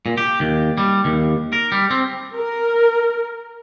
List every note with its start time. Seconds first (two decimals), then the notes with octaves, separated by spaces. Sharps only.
0.06 A#2
0.18 G4
0.40 D#2
0.78 G3
1.05 D#2
1.53 A#4
1.72 G3
1.91 C4
2.36 A#4